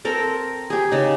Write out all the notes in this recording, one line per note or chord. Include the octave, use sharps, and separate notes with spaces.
C4 A4 A#4
G4 G#4
C#3 D#4